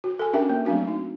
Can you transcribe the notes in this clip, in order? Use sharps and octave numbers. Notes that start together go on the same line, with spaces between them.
F#4
A4 G#5
C#4 D4 G4 A#4 E5 G5
A#3
F#3 A3 C4 D4 F#4
D#4